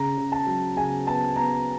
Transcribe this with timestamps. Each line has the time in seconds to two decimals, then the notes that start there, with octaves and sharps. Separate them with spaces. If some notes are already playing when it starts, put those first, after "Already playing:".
Already playing: C#3 A#5
0.17 C#3
0.32 A5
0.46 F#3
0.76 C#3 G#5
1.06 B3 A5
1.36 B3 A#5